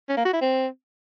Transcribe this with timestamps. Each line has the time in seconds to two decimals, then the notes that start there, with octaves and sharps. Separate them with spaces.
0.09 C#4
0.17 A#3
0.25 F#4
0.33 E4
0.41 C4